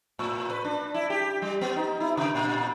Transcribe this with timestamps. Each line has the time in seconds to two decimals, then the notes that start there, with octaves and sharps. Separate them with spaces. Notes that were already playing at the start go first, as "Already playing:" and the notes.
0.19 A2
0.50 B4
0.64 D4
0.94 E4
1.10 G4
1.42 G3
1.61 B3
1.76 D#4
2.00 E4
2.17 C#3
2.35 A#2